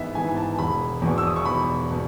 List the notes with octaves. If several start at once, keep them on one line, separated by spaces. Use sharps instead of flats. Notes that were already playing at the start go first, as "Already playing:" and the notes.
Already playing: A1 G#2 E3 B3 E5
G#2 E3 B3 E4 G#5
A5
E1 B5
E2 B2
E6
D#6
C#6
E1 B5
B2